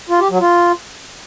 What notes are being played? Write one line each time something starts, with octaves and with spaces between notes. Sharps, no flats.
F4
G4
F#3
F4